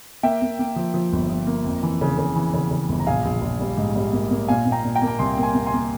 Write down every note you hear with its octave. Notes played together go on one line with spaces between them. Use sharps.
A#3 E5 G5
A#3
A#3
F3
F3
G1
F3
A#3
F2
E3
C#3
C#3
E3
C#3
C#3
G1
A#5
A#1 F5 G#5
A#1
A#1
G3
G#2
G3
A#3
A#3
A#2 F5 G#5
A#2
G5 A#5
A#2
G5 A#5
A#3
A#5
C2 G#5 C6
A#3
G#5 C6
A#3
G#5 C6
A#3